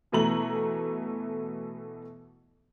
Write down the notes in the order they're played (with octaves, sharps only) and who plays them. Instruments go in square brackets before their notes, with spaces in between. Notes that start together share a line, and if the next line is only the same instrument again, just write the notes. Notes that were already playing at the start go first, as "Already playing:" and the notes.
[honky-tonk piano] B2 E3 A3 A#5 F#7